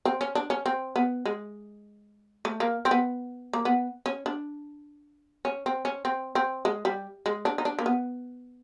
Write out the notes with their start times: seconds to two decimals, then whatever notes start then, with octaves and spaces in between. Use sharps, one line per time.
0.05 C4
0.21 C#4
0.35 D4
0.50 C#4
0.66 C4
0.96 B3
1.25 G#3
2.45 A3
2.60 A#3
2.85 C4
2.91 B3
3.53 A#3
3.65 B3
4.06 C#4
4.26 D4
5.45 C#4
5.66 C4
5.85 C#4
6.05 C4
6.35 C4
6.65 G#3
6.85 G3
7.26 G#3
7.45 D4
7.58 D#4
7.65 D4
7.79 A#3
7.86 B3